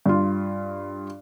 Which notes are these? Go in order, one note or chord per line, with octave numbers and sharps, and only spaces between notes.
G2 F4